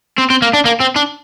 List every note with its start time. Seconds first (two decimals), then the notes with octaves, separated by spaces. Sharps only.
0.18 C4
0.30 C4
0.42 A#3
0.53 D4
0.65 A#3
0.80 C4
0.96 D4